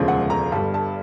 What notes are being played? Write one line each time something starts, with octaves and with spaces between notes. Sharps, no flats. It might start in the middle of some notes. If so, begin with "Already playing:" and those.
Already playing: E1 D2 C#3 F3 G#3
F#5
A#5
G1 G2 D3 G3 A5
A5